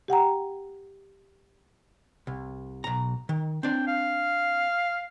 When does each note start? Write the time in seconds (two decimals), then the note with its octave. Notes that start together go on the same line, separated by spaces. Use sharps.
0.08 G4 F#5 G5 A#5
2.27 C2
2.84 B1 A#5
3.29 D#3
3.63 C4 D4 G5
3.88 F5